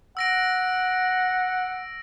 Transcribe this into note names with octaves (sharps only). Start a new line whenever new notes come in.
F#5 E6 A#6 D7